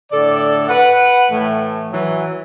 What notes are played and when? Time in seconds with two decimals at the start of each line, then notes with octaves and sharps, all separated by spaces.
0.12 A2 D3 A4 D5
0.68 B4 F#5
1.31 A2 E3 A3
1.92 E3 F#3